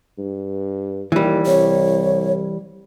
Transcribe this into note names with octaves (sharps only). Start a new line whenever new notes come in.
G2
D#2 E3 G3
C2 C#5